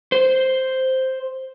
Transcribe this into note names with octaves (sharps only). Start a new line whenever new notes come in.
C5